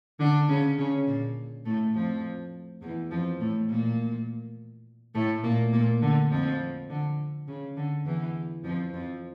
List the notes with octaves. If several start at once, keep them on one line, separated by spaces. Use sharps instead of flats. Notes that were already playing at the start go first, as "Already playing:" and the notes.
D3 D4
C#3 C#4
C#3 C#4
A#2 A#3
A2 A3
F2 F3
E2 E3
F2 F3
A2 A3
A#2 A#3
A2 A3
A#2 A#3
A#2 A#3
D3
F2 F3
D3
C#3
D3
E2 E3
F2 F3
F2 F3